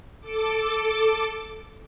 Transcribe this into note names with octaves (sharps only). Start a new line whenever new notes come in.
A4 D6